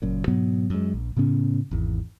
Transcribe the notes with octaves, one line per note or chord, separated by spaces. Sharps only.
F#1 F#2 A#2
G#2 B2 F#3 B3
F#2 G#3
A#1
A2 C#3 B3 C#4
G#1 E2